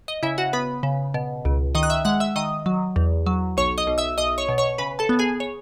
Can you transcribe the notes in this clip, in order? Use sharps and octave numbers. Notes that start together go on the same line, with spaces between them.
D#5
C#3 E4 E5
F#4 F#5
B3 B4 B5
C#3
B2
C#2
D#3 D#5 D#6
F#6
E5 E6
G#3 F#5 F#6
E5 E6
D#3 D#5 D#6
F#3
E2
F#3
B1 C#5 C#6
D#5 D#6
B1
E5 E6
B1 D#5 D#6
C#5 C#6
B2
C#5 C#6
C#3 B4 B5
A4 A5
B3
G#4 G#5
C#5